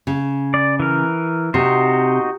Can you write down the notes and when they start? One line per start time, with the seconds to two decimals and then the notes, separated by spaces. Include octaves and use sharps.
0.07 C#3
0.54 D5
0.80 E3 A#4
1.54 C3 D#4 F#4 C5